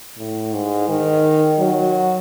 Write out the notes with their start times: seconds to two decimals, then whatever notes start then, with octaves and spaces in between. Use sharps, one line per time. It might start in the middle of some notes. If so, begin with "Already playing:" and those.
0.18 A2
0.53 G#2
0.89 D#3
1.59 F#3